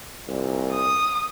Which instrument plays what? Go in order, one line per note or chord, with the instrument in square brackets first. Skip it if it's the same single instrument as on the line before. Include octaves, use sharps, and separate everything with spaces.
[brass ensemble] C2 A#2
[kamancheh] D#6